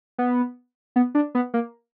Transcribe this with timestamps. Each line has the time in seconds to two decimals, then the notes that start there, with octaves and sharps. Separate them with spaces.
0.18 B3
0.96 B3
1.15 D4
1.35 B3
1.54 A#3